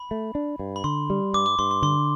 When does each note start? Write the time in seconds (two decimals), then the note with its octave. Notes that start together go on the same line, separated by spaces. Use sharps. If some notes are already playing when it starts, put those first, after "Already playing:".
Already playing: B5
0.11 A3
0.35 D4
0.59 G2
0.76 B5
0.84 D3 C6
1.10 G3
1.34 G2 D6
1.46 D6
1.59 G2 C6
1.71 C6
1.82 D3 C6